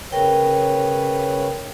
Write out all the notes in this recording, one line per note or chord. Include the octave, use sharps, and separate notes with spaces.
C#3 A#4 B4 C#5 G5